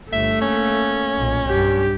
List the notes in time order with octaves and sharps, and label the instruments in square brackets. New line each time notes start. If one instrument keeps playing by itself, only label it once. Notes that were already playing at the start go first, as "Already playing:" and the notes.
[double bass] G1 [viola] A3 [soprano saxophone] E5
[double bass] A#3 [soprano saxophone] C#4
[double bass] B1 A#2
[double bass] G2 [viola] G4